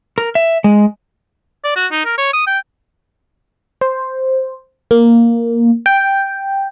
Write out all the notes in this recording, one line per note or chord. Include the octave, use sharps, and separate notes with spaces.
A#4
E5
G#3
D5
F#4
D#4
A#4
C#5
D#6
G5
C5
A#3
G5